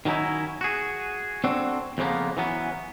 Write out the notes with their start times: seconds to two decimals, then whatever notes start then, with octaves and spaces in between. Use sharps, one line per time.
0.05 D#3 F#3 C#4 D#4 E4
0.61 F#4 G#4
1.44 C4 D4 F#4 A4
1.98 F2 C#3 F3 A#3 B3
2.37 E3 F#3 B3 C#4